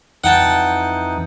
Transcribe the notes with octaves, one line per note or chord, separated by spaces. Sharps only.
F2 E3 D#4 F#5 G5 A5